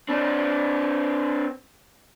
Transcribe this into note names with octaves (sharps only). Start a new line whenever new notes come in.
C4 D4